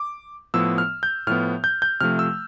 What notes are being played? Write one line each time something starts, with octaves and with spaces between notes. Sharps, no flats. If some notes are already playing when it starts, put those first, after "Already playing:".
Already playing: D6
A2 F3 B3 E6
F6
G6
A2 F3 B3 F6
G6
G6
C3 F3 A3 F6
E6